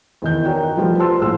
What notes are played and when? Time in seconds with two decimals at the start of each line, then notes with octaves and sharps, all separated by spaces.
0.22 E2 D#3 G6
0.45 D#4 F#4 A#4 C#5 D5 G5
0.77 F3 G3 A3 F4 B4
0.99 C5 A5 C6 E6
1.21 A#1 A2 G#4 C6 E6